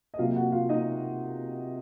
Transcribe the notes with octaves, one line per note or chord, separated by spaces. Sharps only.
D#5
C3 F#3 A#3 F4 F5
F#4 F#5
F4 F5
D#4 D#5